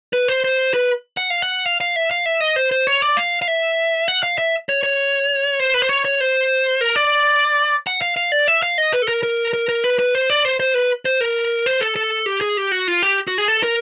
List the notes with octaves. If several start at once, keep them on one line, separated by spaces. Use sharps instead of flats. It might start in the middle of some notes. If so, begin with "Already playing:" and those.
B4
C5
C5
B4
F#5
F5
F#5
F5
F5
E5
F5
E5
D#5
C5
C5
C#5
D5
F5
F5
E5
F#5
F5
E5
C#5
C#5
C5
B4
C5
C#5
C#5
C5
A#4
D5
F#5
F5
F5
D5
E5
F5
D#5
B4
A4
A#4
A#4
A#4
A#4
B4
B4
C5
D5
C5
C5
B4
C5
A#4
C5
A4
A4
G4
G#4
G4
F#4
F4
G4
F#4
G#4
A4
A#4